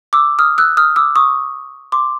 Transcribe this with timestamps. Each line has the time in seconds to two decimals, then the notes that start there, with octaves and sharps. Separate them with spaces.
0.13 D6 E6
0.39 D#6 F6
0.58 E6 F#6
0.77 D#6 F6
0.96 D6 E6
1.16 C#6 D#6
1.92 C6 D6